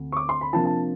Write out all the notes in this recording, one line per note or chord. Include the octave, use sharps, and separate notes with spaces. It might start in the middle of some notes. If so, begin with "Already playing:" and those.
Already playing: D2 C3
C#6
D6
C6
B5
C3 F3 A#3 D4 F4 A5
A5